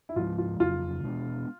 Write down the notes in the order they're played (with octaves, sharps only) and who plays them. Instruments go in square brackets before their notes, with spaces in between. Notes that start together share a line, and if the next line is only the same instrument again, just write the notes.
[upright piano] E4
[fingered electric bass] G#2 F3 G#3 [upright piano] F4
[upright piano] F4
[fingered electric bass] F2 C#3 F#3 [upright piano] F4
[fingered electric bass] B2 G#3 B3 D4